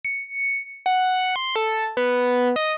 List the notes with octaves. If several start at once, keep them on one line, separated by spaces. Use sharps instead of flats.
C#7
F#5
C6
A4
B3
D#5